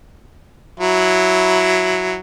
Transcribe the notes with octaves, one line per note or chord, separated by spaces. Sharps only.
F#3 E4